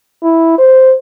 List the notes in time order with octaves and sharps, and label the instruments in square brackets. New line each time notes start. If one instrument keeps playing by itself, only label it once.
[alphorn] E4
C5